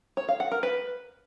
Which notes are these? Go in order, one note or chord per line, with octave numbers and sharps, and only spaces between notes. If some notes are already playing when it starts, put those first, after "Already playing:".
C#5
F5
F#5
A#4
B4